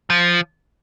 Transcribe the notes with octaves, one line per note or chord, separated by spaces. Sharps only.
F3